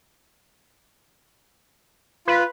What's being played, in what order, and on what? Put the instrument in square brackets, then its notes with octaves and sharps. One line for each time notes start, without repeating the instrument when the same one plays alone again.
[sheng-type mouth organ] F4 [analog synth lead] B4